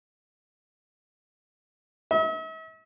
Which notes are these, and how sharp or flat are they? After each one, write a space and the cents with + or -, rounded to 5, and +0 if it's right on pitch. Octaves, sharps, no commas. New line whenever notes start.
E5 -45